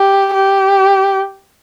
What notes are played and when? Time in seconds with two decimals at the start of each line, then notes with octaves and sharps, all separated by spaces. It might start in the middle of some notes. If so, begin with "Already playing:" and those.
Already playing: G4
0.34 G4